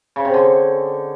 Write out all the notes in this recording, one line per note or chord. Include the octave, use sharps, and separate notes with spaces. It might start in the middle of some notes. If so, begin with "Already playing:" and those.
C#3
C3
D3